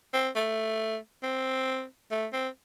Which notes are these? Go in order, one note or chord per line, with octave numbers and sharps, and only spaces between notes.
C4
A3
C4
A3
C4